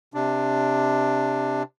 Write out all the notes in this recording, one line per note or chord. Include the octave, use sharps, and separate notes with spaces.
C3 D4